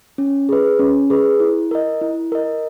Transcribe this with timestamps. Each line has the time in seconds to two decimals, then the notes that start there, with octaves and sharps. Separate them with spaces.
0.18 C#4
0.49 G#4 B4
0.79 C#4
1.10 G#4 B4
1.40 E4
1.71 A#4 D#5
2.01 E4
2.32 A#4 D#5